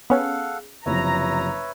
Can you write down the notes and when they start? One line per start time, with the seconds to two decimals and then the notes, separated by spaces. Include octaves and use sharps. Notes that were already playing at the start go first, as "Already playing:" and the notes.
0.10 B3 C#4 G#4 A4 F5 F#5
0.86 F#1 C3 F3 B4 C#5 E5 A#5